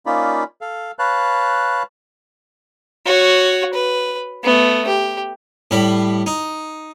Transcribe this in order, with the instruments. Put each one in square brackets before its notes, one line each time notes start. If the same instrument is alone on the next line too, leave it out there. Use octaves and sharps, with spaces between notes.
[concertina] A#3 C#4 D#4 F4 D5 B5
A4 F5
B4 C#5 F5 A5 F#6
[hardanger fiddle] F#4 C#5
B4
A3 B3
G4
[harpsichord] A2 G3 B5
D#4